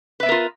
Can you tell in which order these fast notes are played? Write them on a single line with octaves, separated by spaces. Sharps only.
B4 E5 B3 A#4 F4